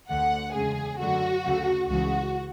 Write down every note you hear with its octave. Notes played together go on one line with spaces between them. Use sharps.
D2 D3 A3 F#5
E2 C#3 G#3 G#4
F#2 D3 F#3 A3 F#4
D2 C#3 F#3 A3
C#2 C#3 E3 G#3 F#4